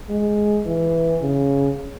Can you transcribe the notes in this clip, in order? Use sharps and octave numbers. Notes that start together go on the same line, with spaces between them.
G#3
E3
C#3